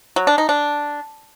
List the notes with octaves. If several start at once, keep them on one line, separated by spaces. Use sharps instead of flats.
F#3
D4
D#4
D4